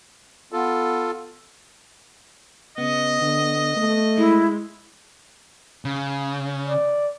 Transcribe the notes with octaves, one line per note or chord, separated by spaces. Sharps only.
B3 F4 A4
C#3 B3 D#5
D3
A3
G#3 E4
C#3
D5